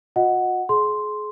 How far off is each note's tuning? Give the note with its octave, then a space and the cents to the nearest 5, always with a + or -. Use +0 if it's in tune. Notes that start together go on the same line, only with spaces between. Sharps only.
F#4 -45 D#5 +0 F#5 +0
G#4 +30 C6 +0